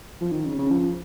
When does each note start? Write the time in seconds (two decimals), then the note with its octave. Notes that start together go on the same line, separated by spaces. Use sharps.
0.21 F3
0.32 D#3
0.45 C#3
0.59 C#3
0.71 F3